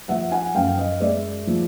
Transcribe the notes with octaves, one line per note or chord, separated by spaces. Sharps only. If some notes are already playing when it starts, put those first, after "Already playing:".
F3 E5 F#5
F#5 G#5
F#2 F5 G5
D#5 F5
G#3 D5 E5
F3